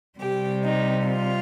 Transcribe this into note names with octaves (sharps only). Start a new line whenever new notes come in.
C3 G3 G4
D#4
F4